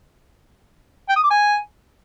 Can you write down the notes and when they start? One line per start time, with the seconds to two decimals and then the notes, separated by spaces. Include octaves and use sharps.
1.09 G5
1.16 D#6
1.23 D6
1.30 G#5